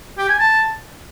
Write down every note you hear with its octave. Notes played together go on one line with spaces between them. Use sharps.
G4
G#5
A5